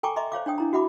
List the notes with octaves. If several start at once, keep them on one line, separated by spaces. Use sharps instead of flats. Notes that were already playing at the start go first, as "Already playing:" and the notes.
A4 G5 G#5 A#5 C#6 D6
D#5 E5 A#5 C6 D6
C5 C#5 F5 D6
D4 C#5 G5 D#6
D4 E4 A#5
F#4 E5 F#5 B5 D6